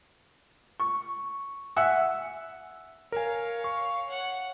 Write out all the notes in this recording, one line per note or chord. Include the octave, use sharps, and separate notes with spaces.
C#6
E5 F#5 G#5 E6
A#4 C#5 F5 G#5
C#6
C#5 F#5